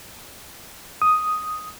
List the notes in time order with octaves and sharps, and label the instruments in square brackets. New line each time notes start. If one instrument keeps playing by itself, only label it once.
[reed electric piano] D#6